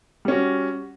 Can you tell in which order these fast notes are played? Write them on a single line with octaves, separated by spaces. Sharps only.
G3 C#4 F#4